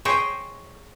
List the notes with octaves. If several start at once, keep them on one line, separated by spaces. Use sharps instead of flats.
G#4 C5 C#5 D#5 G5